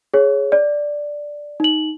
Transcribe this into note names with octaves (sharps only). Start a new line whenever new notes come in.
G#4 C#5
D5
D#4 F#7